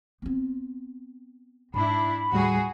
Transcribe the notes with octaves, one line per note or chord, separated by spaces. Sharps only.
B3 C4
G#2 D4 E4 B5
D#2 A2 G3 F#4 G#4